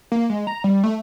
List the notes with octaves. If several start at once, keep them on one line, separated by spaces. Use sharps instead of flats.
A#3
G#3
A#5
G3
A3